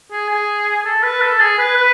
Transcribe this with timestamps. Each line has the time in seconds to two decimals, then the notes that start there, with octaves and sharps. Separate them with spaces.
0.11 G#4
0.29 G#4
0.85 A4
1.03 B4
1.21 A4
1.40 G#4
1.59 B4
1.76 B4